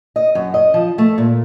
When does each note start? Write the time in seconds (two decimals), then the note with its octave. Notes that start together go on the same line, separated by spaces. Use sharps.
0.16 D#5
0.35 F#2
0.54 D#5
0.74 F3
0.98 A3
1.18 A#2